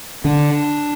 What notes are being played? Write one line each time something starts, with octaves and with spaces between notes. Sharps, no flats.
D3 D4